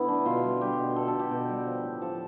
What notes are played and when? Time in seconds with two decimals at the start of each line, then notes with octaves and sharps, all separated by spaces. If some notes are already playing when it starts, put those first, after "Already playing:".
Already playing: D3 B3 E4
0.08 A3 D4
0.26 B2 F4
0.43 G3
0.61 G3 G4
0.78 B2
0.96 B2 A4
1.08 A4
1.14 B2
1.19 G4
1.31 B2 G4
1.49 G3
1.66 F3
1.84 A2
2.01 F3 A4